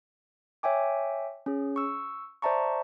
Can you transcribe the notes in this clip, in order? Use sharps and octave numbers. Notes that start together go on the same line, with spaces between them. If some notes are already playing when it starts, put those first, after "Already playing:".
C#5 E5 G5 G#5 D6
C#4 G#4
C#6 E6
C5 D5 E5 A5 A#5 C#6